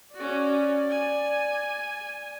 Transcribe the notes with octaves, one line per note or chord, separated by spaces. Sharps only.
C#4 F#4 D5
G#5